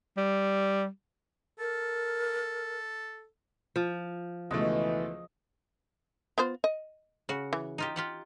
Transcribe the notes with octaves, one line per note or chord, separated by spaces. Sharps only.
G3
A4 A#4
F3
C#2 B2 E3 A3 D#5
B3 F4 C5
D#5
C#3 F#4
E3
D#4 F4 G4
F4 G4 F#5